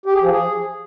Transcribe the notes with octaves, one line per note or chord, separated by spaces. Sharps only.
G4
G#4
F3
G#4